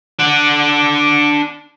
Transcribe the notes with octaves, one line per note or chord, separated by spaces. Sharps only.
D4 F#5